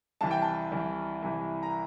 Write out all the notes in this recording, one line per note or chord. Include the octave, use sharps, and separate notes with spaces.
C2 C3 E3 A5
G5
A5
C2 C3 E3
C2 C3 E3
A#5